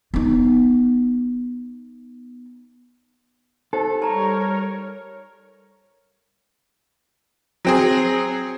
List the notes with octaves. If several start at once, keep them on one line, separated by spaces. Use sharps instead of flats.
B3 D#4
D#4 G4 A4 C5
G3 A#4 C#5 A5 A#5
F#3 C4 G#4